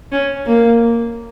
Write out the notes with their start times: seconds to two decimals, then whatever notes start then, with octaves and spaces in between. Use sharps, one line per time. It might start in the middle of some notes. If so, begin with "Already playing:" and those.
0.12 C#4
0.46 A#3